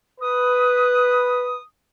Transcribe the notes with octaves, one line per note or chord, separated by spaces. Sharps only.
B4 D#6